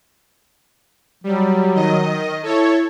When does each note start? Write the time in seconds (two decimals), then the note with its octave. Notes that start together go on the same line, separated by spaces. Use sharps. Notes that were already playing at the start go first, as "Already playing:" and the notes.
1.24 F#3 G3
1.75 D#3 D#5
2.43 E4 A4 C#5